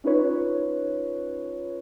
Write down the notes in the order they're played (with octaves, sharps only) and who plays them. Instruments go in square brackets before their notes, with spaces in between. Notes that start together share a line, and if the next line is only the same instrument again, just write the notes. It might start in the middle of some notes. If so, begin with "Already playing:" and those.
[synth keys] C#4 D#4 F4 B4 C#5